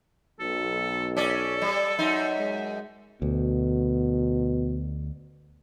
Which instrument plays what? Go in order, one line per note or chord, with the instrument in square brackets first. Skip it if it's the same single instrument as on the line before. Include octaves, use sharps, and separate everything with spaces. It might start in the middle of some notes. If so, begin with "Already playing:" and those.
[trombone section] B1 [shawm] A4
[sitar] C#4 D5 [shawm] A4
[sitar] G3
F#2 D#4
[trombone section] G#3
[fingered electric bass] D2 [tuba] B2